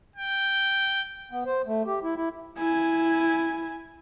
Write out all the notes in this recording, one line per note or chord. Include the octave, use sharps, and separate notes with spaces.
G5
B3
C5
A3
G4
E4
E4
E4 G#5